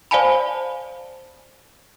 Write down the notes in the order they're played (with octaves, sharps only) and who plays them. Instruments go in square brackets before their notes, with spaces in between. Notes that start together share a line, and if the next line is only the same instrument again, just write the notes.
[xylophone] C5 D5 F5 G#5 A5 B5